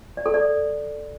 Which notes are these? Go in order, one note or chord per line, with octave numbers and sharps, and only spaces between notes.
D5
A4
D5